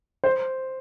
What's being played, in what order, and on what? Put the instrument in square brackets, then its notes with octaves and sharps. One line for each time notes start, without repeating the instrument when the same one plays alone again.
[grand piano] C5